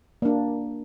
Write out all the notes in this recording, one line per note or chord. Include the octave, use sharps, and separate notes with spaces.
A#3 D4